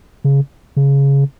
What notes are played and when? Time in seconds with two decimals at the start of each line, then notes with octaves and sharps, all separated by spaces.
0.24 C#3
0.77 C#3